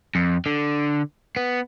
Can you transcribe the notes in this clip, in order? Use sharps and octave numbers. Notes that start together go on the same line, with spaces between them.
F2
D3
B3